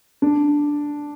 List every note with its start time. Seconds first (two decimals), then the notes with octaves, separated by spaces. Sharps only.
0.22 D4